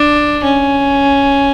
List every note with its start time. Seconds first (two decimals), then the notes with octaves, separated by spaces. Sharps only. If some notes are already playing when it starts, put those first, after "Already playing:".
Already playing: D4
0.43 C#4